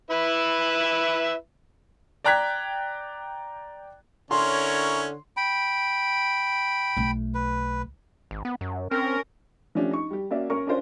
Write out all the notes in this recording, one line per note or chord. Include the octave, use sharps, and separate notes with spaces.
E4 B4 E5
D5 G5 A#5 F#6 G#6 B6
D3 C#4 E4 A#4 C#5 C6
G5 B5
B1 A3
B4
G#1
B3
F#2
C4 C#4 A#4
F3 A3 C#4 D4 G4
D#4 C#6
G3 G4
A#3 C#4 F#4 D5 E5
C#4 A#4 C#6
C#4 D4 F4 A#4 C5 D5